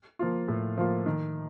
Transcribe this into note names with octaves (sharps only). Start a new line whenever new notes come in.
F3 A#3 F4
A2
F3 A#3 F4
D#3